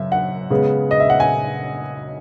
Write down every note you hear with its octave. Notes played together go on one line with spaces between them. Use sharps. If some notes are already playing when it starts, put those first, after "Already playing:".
Already playing: F#2 C#3 E5
F#5
C#3 G#3 B3
D#5
E5
F#5
G#5